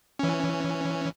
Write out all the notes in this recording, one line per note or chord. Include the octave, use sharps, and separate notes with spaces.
E3 C#4